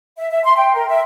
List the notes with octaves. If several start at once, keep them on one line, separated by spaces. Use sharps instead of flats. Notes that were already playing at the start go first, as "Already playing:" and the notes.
E5
E5
C6
G5
A#4
E5